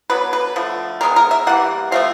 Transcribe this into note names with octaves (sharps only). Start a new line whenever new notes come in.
D3 F#3 B3 B4
B4
D3 F3 A3
D#3 G#3 B3 A#4
A#4
E5
E3 G3 A#3 F#5
F3 A3 C4 F5